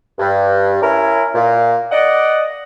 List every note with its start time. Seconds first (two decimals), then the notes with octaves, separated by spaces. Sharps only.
0.19 G2
0.82 C#4 E4 A#4
1.35 A#2
1.91 D5 D#5 F#5